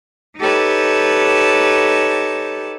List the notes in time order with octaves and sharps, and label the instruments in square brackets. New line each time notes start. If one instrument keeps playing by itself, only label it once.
[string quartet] D#4 G4 A4 B4 C#5 A5